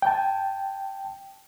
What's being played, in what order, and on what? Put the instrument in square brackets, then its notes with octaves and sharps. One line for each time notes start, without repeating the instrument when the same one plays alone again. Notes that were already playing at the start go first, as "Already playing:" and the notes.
[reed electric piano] G5 A5